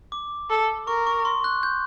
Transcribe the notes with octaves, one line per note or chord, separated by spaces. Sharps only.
D6
A4
A#4 C#6
C#6
C6
F#6
G6